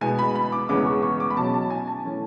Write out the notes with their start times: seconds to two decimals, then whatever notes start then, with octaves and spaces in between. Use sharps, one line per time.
0.01 B2 G#3 B3 G#5
0.19 B5
0.35 B5
0.52 D6
0.69 E2 C#3 G#3 B3 D6
0.86 C#6
1.03 C#6
1.20 D6
1.30 B5
1.37 B2 F#3 C#4 A5
1.54 A5
1.70 G#5
1.88 A5
2.04 E3 A3 C#4